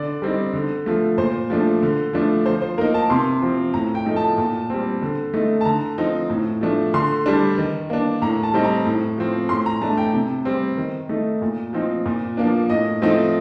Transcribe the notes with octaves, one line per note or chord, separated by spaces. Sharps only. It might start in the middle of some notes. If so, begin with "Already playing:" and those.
Already playing: D3 D5
G3 C4 D#4
D3
F3 A3
A#2 C5
F3 A3 D4
D3
F3 A3 D4
F3 C5
C5
A#3 D#4 A#4
A5
C3 C6
F3 C4
A2 A#5
G5
F3 A3 D#4
A5
A#2
G3 C4
D3
A3 D#4
A5
D3 A#5
F3 C4 D#4
A2
F3 A3 D4
D3 C6
G3 D4
D#3
A#3 D4
A2 A#5
A5
G3 C4 D#4
A#5
A2
F3 C4
A2 C6
A#5
A3 D4 A5
G5
C3
G3 C4
D#3
A3 D#4
A#2
F3 C4 D#4
A#2
F3 A#3 D4
A2 D#5
F3 A3 C4 D#4